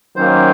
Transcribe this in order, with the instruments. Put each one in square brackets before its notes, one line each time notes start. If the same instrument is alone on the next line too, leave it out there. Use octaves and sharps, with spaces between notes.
[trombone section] D#3 F#3 A#3 C#4 [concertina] C5